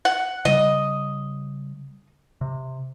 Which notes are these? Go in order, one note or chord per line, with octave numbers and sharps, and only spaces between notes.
F#5
C#3 G3 D#5
C3